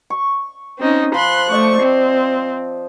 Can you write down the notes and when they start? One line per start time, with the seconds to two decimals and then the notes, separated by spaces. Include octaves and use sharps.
0.10 C#6
0.78 C4 C#4 D#4
1.14 F3 B5 C6 F#6
1.50 A3 C5 D5 D#5 C#6
1.81 C4